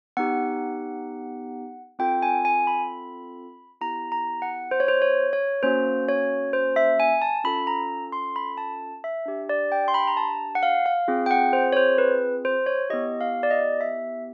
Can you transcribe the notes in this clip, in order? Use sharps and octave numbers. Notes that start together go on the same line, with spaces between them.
B3 D#4 G4 F#5
C4 F4 A4 G5
G#5
G#5
B5
B3 E4 G4 A#5
A#5
F#5
C5
C#5
C5
C#5
C#5
A#3 C#4 F#4 C5
C#5
C5
E5
G#5
A5
C#4 F4 A4 B5
A#5
C6
B5
A5
E5
D4 G4
D5
G5
C6
B5
A#5
A5
F#5
F5
F5
C4 F4 G#4
G5
F#5
C5
C#5
C5
B4
C5
C#5
B3 E4 G4 D#5
F5
D5
D#5
E5